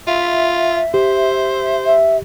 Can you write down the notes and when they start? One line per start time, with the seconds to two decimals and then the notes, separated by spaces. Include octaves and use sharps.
0.07 F4 E5
0.94 G4 C5
1.86 E5